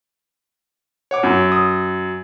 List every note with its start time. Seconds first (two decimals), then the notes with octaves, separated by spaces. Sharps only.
1.11 C#5 F#5 D6
1.23 F#2
1.52 D#6